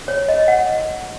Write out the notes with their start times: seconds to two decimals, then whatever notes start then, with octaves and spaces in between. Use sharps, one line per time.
0.08 C#5
0.29 D#5
0.48 F#5